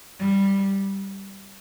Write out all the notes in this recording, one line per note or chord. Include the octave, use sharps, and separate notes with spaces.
G3